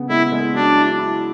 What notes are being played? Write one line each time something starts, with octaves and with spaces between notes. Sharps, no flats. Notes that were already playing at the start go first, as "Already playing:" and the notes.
Already playing: C#3 B3
G#3 E4
G#3
F#3 D4
E4
E4